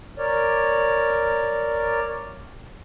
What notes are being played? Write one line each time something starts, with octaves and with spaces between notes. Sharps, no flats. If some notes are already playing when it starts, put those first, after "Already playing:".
A#4 C#5 D5